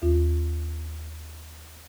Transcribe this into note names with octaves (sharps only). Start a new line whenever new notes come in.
D#2 F4